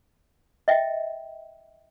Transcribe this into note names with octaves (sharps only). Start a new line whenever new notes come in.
D#5 E5 G5